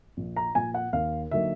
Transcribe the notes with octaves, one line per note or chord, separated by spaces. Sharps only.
A#1
A#5
A#2 F3 G#5
F#5
D#2 F5
D3 F#3 A#3 D#4 E5